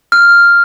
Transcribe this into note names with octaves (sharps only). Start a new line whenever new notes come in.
F6